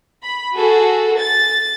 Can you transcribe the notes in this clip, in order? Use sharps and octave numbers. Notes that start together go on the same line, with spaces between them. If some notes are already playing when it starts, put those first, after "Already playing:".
B5
F#4 G#4 A4
A6